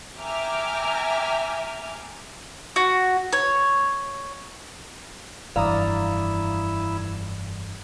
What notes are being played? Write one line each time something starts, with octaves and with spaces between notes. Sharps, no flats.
E5 G5 G#5 A#5 D6 F6
F#4
C#5
F1 G2 E3 E4 D5 F5 A#5 D#6